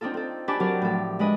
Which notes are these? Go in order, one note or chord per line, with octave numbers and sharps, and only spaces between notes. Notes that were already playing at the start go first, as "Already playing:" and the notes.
C4 D4 D#4 F4 A4
C4 A4
D4 G4 B4 G#5 A5 D6
F#3 C4 F#4 G4 A#4 D5
A2 F3 A4
G#3 D4 B4 D#5 G#5